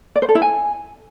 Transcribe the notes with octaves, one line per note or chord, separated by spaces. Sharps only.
D5
C5
A4
E4
G#5